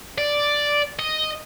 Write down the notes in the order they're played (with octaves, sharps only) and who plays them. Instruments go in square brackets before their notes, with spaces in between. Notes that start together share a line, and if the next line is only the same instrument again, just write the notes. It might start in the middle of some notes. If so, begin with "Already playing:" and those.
[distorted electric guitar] D5
D#5